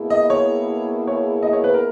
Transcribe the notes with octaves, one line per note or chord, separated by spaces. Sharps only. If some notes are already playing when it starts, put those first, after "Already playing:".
Already playing: B2 A#3 E4 G#4
D#5
C#5
C#5
D#5
C#5
B4
A#4